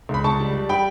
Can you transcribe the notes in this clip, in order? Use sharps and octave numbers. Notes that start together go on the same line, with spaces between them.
C#2 B5
C#2 A5 C#6
G3
G3
G3 G5 B5